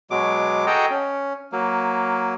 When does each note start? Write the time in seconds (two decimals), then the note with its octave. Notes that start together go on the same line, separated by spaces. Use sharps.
0.11 B2 F#3 G#3 D6
0.67 F#4 G#4 A4 D#5 G5 A#5
0.90 C#4
1.52 F#3 A#3